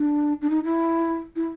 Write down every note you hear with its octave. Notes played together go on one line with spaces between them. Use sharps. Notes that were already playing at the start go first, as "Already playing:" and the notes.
Already playing: D4
D4
D#4
E4
E4